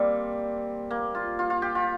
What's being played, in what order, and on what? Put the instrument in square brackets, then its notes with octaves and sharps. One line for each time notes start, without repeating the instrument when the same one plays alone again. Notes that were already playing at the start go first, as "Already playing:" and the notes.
Already playing: [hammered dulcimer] G3 A#3 C4
A#3
F4
F4
F4
G4
F4